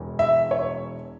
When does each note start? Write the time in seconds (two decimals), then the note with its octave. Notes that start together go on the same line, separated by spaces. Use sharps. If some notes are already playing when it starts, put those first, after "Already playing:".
Already playing: E1 E2 E3
0.19 E5
0.51 C#5